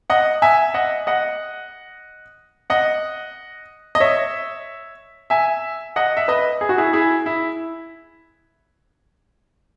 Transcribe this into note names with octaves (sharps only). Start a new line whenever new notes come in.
D#5 F#5
E5 G#5
D#5 F#5
D#5 F#5
D#5 F#5
D#5
C#5 E5
E5 G#5
D#5 F#5
E5
B4 D#5
G#4
F#4
E4 G#4
E4 G#4
E4